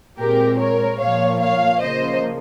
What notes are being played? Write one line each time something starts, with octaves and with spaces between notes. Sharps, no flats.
A#2 G#3 C4 G4 A#4
A#4 C#5
A#2 F3 A#3 C#5 F5
C#5 F5
C#3 F3 A#3 C5 D#5